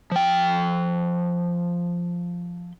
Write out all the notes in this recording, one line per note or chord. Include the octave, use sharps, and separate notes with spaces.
F3 G5